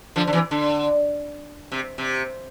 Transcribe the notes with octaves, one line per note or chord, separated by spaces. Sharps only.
D3 F3
D3
C3 E3
D3
C3
C3